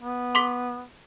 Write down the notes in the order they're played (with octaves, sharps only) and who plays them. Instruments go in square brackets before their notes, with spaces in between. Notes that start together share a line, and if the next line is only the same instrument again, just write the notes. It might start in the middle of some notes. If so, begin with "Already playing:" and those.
[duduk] B3
[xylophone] C6 D6 B6